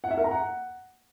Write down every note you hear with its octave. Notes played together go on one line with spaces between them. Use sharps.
F#5
E5
A#4
A#5
F#5